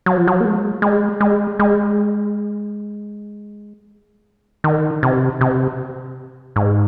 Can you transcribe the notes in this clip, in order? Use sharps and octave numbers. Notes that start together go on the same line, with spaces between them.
F#3
F3
F#3
A#3
G#3
G#3
G#3
G#3
D#3
C3
C3
G#2